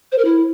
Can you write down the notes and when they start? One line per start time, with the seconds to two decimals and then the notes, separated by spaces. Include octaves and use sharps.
0.12 C5
0.18 A#4
0.25 E4